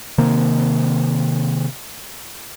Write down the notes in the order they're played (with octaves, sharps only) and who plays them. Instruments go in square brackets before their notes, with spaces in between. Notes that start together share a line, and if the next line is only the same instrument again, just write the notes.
[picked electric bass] C3 D#3 A#3